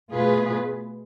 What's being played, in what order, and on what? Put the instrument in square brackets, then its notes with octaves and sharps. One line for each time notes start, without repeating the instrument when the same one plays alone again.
[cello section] B2 A3 F4 G#4 B4